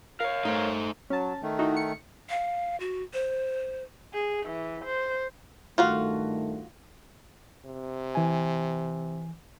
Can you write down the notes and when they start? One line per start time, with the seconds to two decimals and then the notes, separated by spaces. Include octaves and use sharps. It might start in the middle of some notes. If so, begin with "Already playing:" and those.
0.20 A#4 C#5 F5
0.45 A3 D#4 C5
1.10 F#3 C#4 A5
1.42 D#3 A3
1.59 D#4 E4 F#4
1.77 C#7
2.30 F5
2.80 F#4
3.13 C5
4.14 G#4
4.46 E3
4.84 C5
5.78 G2 D#3 A3 F4 F#4 F5
7.66 C3
8.15 E3 G#5